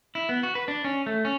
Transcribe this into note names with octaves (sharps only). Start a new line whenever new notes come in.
E4
B3
F#4
B4
D4
C#4
A3
C#4